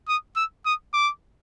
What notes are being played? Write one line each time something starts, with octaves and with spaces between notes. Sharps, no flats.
D#6
E6
D#6
D6